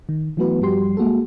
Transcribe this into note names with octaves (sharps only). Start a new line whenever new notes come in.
D#3
E3 F#3 A3 B3 F#4 B4
G2 F3 G3 F#4 G4 C6
G#3 A#3 F#4 G#4 A4